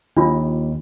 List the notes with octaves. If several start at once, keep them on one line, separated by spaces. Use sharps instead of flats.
D#2 D4 F4